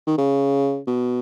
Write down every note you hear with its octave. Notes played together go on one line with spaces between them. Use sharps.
D#3
C#3
B2